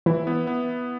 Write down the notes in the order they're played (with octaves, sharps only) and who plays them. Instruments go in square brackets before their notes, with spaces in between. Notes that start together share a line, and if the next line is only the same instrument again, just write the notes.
[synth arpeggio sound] E3 [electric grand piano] E4
[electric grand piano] B3
B3